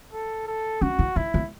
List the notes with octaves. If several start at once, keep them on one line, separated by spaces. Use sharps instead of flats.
A4
A4
C#4 F#4
E4
D#4 E4
B3